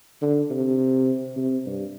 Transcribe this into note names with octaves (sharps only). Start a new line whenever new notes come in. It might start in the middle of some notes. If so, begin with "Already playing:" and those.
D3
C3
C3
G2